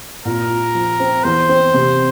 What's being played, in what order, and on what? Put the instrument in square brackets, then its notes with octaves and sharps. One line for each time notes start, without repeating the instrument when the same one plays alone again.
[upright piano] A#2 [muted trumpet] A#4
[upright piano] F4
F3
C4
[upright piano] E2 [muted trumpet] C5
[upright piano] C4
C3